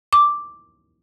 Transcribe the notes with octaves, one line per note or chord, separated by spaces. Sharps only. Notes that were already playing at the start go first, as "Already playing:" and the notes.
D6